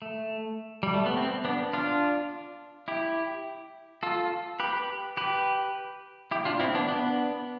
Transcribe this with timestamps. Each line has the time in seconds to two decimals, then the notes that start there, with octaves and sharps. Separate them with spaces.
0.02 A3
0.83 G3
0.94 A3
1.06 B3
1.17 C4
1.45 B3 D4
1.73 D4 F4
2.88 E4 G4
4.03 F4 A4
4.60 G4 B4
5.17 G4 B4
6.31 E4 G4
6.45 D4 F4
6.60 C4 E4
6.74 B3 D4
6.88 B3 D4